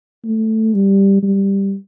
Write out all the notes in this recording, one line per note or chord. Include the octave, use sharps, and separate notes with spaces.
A3
G3
G3